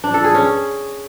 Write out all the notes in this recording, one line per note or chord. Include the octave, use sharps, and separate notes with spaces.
D4
A4
G#4
C#4